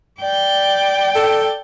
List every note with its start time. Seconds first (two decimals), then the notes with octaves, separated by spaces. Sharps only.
0.21 D5 G5
1.16 A4